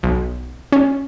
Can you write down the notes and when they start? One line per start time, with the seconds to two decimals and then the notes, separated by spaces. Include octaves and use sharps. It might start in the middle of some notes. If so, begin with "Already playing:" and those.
0.03 B1
0.72 C#4